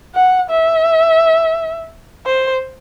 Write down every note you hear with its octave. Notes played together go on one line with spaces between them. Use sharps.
F#5
E5
C5